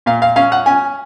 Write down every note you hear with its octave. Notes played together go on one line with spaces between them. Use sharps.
A#2 F5
F5
C#4 F5
F#5
C#4 G#5